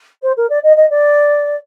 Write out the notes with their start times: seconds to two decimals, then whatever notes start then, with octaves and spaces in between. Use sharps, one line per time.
0.22 C5
0.36 A#4
0.49 D5
0.63 D#5
0.76 D#5
0.90 D5